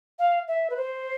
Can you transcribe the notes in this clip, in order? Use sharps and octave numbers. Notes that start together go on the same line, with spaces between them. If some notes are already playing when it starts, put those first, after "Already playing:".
F5
E5
B4
C5